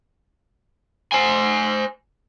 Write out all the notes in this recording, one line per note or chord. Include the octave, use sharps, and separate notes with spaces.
C5 G#5